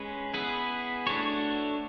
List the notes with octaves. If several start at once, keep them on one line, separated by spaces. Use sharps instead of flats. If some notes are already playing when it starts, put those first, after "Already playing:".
Already playing: G#3 C#4 G#4 B4
B3 E4 G#4 B4
A3 D4 F#4 C#5